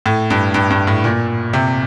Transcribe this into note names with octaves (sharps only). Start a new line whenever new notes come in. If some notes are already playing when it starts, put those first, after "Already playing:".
A2
G2
G2
G2
A2
A#2
C3